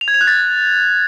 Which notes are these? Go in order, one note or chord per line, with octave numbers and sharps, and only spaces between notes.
F7
G#6
F7
F#6
A6